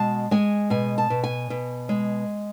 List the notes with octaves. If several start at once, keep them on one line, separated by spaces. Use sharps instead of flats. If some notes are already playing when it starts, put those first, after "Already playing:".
Already playing: B2 G#3 A5
G#3 G#5
B2 G#5
A5
B2
G#5
B2
G#3